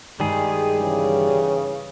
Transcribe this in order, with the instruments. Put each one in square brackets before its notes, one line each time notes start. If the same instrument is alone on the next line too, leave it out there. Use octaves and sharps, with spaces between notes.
[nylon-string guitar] G2 D#3 [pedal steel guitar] G3 G#4 [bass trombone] G#3
[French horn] C#3 [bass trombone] E3